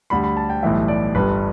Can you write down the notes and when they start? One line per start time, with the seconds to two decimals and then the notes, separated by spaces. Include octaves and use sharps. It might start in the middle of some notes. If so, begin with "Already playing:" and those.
0.10 D2 D3 G3 B5
0.24 B5
0.37 A5
0.50 G5
0.63 B1 A2 E3 G3 E5
0.88 D5
1.15 G1 G2 G3 B4